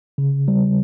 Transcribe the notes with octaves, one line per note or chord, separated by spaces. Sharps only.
C#3
G3